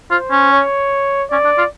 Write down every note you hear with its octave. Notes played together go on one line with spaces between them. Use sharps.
F4 C5
C#4
C#5
C#4 D5
D4
F4